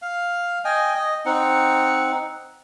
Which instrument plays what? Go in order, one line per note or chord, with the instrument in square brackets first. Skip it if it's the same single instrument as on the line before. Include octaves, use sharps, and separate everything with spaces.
[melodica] F5
D#5 G5 G#5
D#5
C4 D#4 F#5